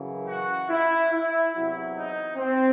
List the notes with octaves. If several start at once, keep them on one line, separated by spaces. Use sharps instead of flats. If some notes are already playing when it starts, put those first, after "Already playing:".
Already playing: F#2 C#3 E3
F#4
E4
E4
E2 C3 F#3 E4
D#4
C4